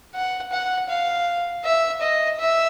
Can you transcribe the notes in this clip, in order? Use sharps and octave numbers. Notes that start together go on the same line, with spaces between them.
F#5
F#5
F5
E5
D#5
E5